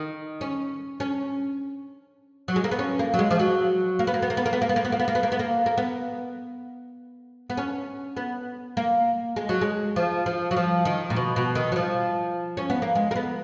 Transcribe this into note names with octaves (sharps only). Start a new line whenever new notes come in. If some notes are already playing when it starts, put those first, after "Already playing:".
Already playing: D#3
C#4
C#4
F#3
G#3
A#3
B3
C#4
A#3
F#3
G#3
F3
F#3
A#3
B3
A#3
B3
A#3
B3
A#3
B3
A#3
B3
A#3
B3
A#3
B3
A#3
B3
A#3
B3
A#3
A#3
B3
B3
C#4
B3
A#3
G#3
F#3
G#3
F3
F3
F#3
F3
D#3
A#2
B2
B2
D#3
F#3
F3
C#4
B3
A#3
G#3
A#3
B3